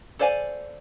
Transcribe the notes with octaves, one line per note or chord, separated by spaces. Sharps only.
A4 C5 D5 F5 G#5